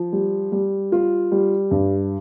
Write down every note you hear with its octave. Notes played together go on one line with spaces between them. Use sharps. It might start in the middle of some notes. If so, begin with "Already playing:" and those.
Already playing: F3
G3
G3
F4
G3
G2